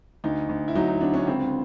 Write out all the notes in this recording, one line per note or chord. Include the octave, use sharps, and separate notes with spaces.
D2 D#4
D2
E4
F#3 D#4
D#4
D3 D4
C#4
C#2 C4